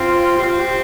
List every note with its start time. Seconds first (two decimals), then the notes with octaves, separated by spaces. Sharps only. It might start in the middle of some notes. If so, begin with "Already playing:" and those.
Already playing: C4 F4
0.37 G4
0.43 C4 F4
0.60 G4